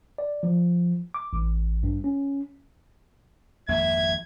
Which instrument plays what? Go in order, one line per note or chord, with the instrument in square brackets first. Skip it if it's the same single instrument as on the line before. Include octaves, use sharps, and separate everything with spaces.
[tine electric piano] D5
F3
D6
A1
G2
C#4
[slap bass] G#1 F2 A#3 [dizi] E5 [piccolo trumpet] G#6